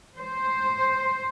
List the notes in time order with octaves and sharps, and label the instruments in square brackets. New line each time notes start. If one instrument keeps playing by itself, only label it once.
[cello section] C5